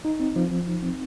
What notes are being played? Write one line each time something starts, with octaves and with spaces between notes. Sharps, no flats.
D#4
C4
F3
F3
D#4
C4